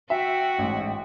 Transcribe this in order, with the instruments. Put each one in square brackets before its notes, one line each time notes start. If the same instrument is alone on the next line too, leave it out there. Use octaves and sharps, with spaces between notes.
[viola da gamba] F#4 [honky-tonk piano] E5 [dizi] G5
[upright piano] A1 G#2